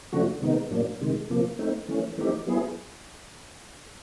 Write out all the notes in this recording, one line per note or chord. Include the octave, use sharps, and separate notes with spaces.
C#3 F3 A3 D4 F#4
C3 D#3 G#3 B3 D#4
A2 F#3 A#3 D4
C3 D#3 G#3
C3 F3 A#3
A3 C4 D#4
E3 A3 C#4
E3 A3 C4 D#4 G4
F#3 B3 E4 G#4